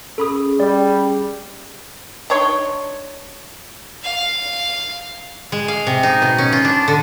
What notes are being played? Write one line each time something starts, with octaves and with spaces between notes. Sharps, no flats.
C#4 G#4 A4 B5 D#6
G3 D5
D4 D#4 C#5 C6
F5
G#3
F5
C3
D#4
B2
C#4
F4
D4
D3